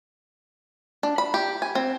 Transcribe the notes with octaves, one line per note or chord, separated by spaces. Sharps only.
D4
B5
G4
G#5
C4